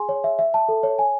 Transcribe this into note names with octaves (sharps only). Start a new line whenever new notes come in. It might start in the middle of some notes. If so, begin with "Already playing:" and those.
Already playing: G#4 G#5 C6
C#5
E5
E5
A5
A4
C#5
G#5